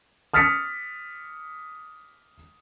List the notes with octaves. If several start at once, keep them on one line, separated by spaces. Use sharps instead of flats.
D#6 F6 A6 B6 C#7